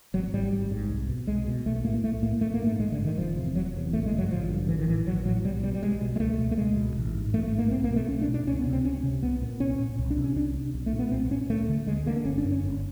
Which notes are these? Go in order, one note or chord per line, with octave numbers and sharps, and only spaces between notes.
G#1 F#3
G#2 G3
G#1
G#2
C2
B2
C2 G#3
B2
B1 A3
A2 A#3
B1 A3
A2 A#3
A#1 A3
A#3
G#2
A3
A#1 G#3
D3
G#2
D#3
F1 F3
E2 C3
F1 F#3
E2 C3
A1 A3
G#3
G2 D3
F#3
A1 F3
G2 D3
A1 E3
D#3
A2 E3
A1 F#3
A2 F#3
B1 G3
B2 G3
G3
B1 G#3
B2
G#3
C#2 A3
B2
A3
C#2 G#3
B2
A1
G#2
A1 A3
A3
G#2
A#3
B1 C4
A#3
B2
A3
B1 C#4
D4
B2
D4
C#2 C#4
B3
C3
C4
C#2 C#4
C3
C2 B3
A#2
C2 C#4
A#2
C2
D4
C3
C#4
C2 D4
C3
B1
A3
A#2
B3
B1 C4
A#2 C#4
D2 A3
D3
D2 G#3
D3 A#3
G1 C#4
D4
F#2 D3
C#4
G1